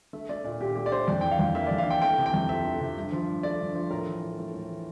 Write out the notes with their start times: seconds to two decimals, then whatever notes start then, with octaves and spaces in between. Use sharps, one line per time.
0.13 A3 E5
0.29 A3 D5
0.44 A#2 D5
0.61 A#2 G4
0.76 A3 G4
0.86 D5
0.92 A3 C5
1.08 F2 D5
1.21 E3 G5
1.31 F5
1.39 F2
1.55 A#3 E5
1.67 D5
1.71 F2
1.78 F5
1.87 E3 G5
2.02 A3 G5
2.18 C3
2.26 G5
2.34 F2
2.49 F3 E5
2.65 A3
2.81 C3
2.96 G2
3.12 F3
3.28 G2
3.43 A3 D5
3.59 G2
3.75 F3
3.90 A2 A#4
4.07 E3
4.22 A2
4.38 A3
4.54 A2
4.70 E3